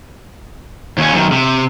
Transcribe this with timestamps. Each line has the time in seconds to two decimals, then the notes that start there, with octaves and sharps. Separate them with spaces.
0.98 D#2 C#4
1.13 F#2 D#3
1.32 C3